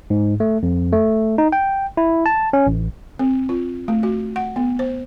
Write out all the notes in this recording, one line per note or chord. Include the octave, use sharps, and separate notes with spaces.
G#2
A3
F2
A3
D#4
G5
E4
A5
C#4
A1
C4
F4
A3
F#4
F#5
B3
C5